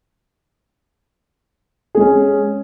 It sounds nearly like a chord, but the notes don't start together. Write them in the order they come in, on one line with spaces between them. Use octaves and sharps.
G#4 G#3 C#4